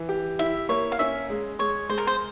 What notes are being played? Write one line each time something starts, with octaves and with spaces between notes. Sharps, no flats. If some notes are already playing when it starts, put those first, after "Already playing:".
Already playing: E3
G4
E4 E5
A#3 C#5
F5
C#4 E5
G#3
G#3 C#5
G#3 C5
A#4
C5